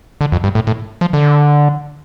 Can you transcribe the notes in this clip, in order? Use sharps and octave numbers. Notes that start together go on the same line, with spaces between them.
D3
F2
G2
A2
A2
F3
D3